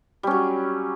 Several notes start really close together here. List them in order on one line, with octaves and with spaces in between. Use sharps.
G3 C#4 F#3